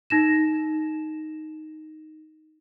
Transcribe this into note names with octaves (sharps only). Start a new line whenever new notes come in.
D#4 A#6 E7